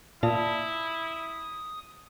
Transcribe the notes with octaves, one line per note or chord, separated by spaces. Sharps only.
A#2 E4 F4 D5 A5 D#6